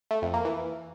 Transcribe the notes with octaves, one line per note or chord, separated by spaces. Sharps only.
A3
F2
A#3
E3